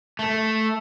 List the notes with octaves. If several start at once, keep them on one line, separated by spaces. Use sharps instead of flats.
A3